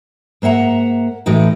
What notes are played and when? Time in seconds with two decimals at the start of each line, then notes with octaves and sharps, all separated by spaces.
0.42 G#2 A#3 E5 F#5 A#5
1.26 A2 E3 D#4 F#4